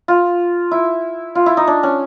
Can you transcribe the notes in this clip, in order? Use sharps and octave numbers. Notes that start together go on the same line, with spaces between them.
F4
E4
F4
E4
D#4
D4
C#4